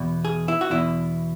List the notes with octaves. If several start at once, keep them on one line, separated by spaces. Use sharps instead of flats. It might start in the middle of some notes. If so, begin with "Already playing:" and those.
Already playing: E2 B2
G#4
E4
F#4
E2 B2 E4